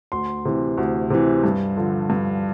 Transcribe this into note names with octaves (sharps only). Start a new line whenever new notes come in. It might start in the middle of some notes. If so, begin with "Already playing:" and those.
D2 C6
C3 E3
D2
C3 E3
G2
D3 F3
G2